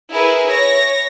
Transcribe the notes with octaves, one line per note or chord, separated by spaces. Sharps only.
E4 G#4 A#4 B4
C#5 A#6